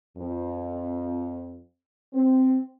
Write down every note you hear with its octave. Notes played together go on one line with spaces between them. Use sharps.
F2
C4